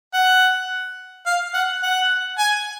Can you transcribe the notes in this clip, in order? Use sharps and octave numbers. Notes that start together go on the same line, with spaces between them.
F#5
F5
F#5
F#5
G#5